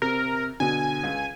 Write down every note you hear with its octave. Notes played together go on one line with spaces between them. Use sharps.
C3 A#4
B2 D3 G#5
C#2